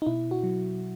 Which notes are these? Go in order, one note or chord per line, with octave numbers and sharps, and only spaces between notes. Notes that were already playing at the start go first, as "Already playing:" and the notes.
D#4
B2 E4
F#4
F#3